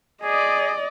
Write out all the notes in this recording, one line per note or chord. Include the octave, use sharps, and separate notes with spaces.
G#4 D5 D#5